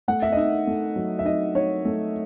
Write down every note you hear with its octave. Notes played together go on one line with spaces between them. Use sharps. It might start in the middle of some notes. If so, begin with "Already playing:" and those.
A3 F#5
E5
D#5
D#4 E5
A3
F#3
E5
D#4 D#5
D#4 C#5
A3